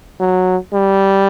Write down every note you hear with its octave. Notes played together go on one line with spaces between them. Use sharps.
F#3
G3